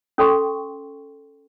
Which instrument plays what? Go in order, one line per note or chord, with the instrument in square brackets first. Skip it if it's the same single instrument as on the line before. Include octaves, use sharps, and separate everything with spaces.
[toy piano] C#4 A4 G5 C6 C#6